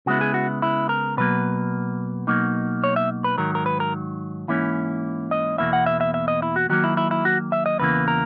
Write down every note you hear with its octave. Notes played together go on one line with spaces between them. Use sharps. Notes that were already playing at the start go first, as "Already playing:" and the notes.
C#3 G#3 B3 E4 F#4
G#4
F#4
E4
A#4
B2 F#3 A#3 B4
B2 F#3 A#3 D#4
C#5
E5
B4
G#2 D#3 F#3 A#4
A#4
B4
A#4
G#2 E3 A#3 C#4 E4
D#5
E2 B2 A#3 E4 E5
F#5
E5
E5
E5
D#5
E4
F#4
D#3 F#3 A#3 F#4
E4
E4
E4
F#4
E5
D#5
E2 C#3 E3 A#3 B4
A#4